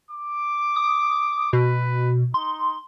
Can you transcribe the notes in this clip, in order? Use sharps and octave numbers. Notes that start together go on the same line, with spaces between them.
D6
D#6
B2 B4
D#4 C6